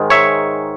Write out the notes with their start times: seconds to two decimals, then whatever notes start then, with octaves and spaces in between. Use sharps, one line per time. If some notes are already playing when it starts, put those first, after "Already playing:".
Already playing: G#2 D#3 G#3
0.10 C#5 E5